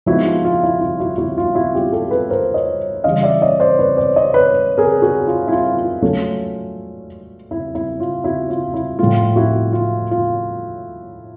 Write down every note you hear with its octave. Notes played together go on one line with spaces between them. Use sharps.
F3 G#3 B3 D#4 E4 F#4
F4
F4
E4
F4
E4 F#4
E4 F#4
F4
E4 F#4
F4 G4
G4 A4
A4 B4
A#4 C5
C#5 D#5
C#3 E3 G3 D#5 F5
D5 E5
C#5 D#5
C5 D5
B4 C#5
C5 D5
C#5 D#5
B4 C#5
G#4 A#4
F#4 G#4
F4
E4
F4
F4
F#3 A3 C#4
E4
E4
F4
E4 F#4
F4
E4
A2 F3 A3 F4
E4 F#4
F4
F4